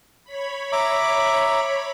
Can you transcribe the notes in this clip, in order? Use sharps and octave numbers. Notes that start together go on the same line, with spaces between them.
C#5 B5
E5 A#5 D6